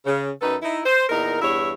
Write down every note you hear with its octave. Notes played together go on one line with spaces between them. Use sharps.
C#3
F#2 D#4 A4 B4
D#4 E4
C5
E2 A#2 D#4 A#4
E2 G2 E4 C#5 E5